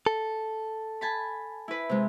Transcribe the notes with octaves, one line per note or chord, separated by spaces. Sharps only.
A4
G#5 A5 B5
E4 B4
C3 G#3